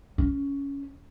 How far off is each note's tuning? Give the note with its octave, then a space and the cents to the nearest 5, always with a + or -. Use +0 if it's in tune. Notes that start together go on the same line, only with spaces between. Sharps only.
C#4 +10